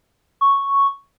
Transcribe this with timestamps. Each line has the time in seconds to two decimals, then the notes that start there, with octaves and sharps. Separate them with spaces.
0.41 C#6